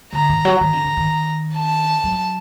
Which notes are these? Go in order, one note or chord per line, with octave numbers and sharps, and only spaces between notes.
D3 A#5
D#3
F#3
D#3 A#5
D3
D3
D#3
A5
F#3